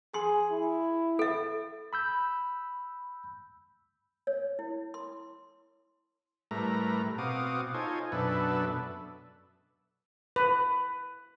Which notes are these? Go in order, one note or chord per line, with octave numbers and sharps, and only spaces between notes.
G#4 C6
E4
A4 E5
B5 E6 G6
C#5
E4
C6
A2 G3 A3 A#4 B4 A#5
B2 C4 F#4 F5 D6 D#6
D#4 F4 A4 C5 C#5 G#5
F#2 B2 D4 A4 B4 E5
B4